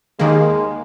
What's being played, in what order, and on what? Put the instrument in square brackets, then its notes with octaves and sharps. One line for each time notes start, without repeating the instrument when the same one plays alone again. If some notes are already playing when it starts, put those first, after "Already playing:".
[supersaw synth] D#2 D#3 A#3 [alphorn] G#3